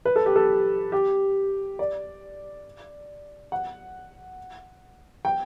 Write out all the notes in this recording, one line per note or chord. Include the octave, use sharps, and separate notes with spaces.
B4
A4
G4
A4
G4
D5
F#5
G5